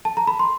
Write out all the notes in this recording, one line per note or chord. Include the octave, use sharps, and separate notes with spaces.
A5
A#5
B5
C6